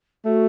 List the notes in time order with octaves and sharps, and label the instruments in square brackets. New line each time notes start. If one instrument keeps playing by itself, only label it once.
[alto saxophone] A3 [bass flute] F#4